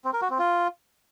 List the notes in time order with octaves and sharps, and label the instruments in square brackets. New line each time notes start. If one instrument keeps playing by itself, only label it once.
[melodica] C4
A#4
F#4
C4
F4